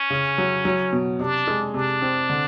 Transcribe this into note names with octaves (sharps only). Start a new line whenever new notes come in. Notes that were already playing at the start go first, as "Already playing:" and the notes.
Already playing: C#4
C#3
F#3
F#3
B2
C3 D4
G#3
C3 D4
C4
D3